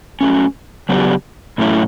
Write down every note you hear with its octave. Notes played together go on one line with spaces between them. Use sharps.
F#3 A3 C#4
C#3 F#3 B3 D4 G4
A2 F#3 A3 C#4 E4